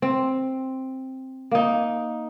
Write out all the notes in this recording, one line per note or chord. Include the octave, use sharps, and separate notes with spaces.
C4
A#3 D#4